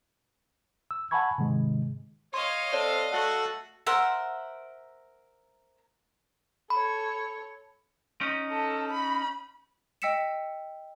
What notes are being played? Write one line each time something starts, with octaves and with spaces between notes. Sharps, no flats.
E6
F#5 G#5 A5 B5 C#6 G#6
G#2 C3 D#3 G#3
C#5 D#5 F5 C6
C4 A4 C#5 D5
A3 F#4 A4 F#5
A#4 C5 E5 F#5
A4 C#5 B5
C#4 D#4
A4
B5
D#5 G5 E6 B6 C#7 E7